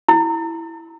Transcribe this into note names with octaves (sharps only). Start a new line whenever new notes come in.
E4